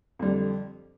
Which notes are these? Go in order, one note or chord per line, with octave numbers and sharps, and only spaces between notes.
F2 D3 G3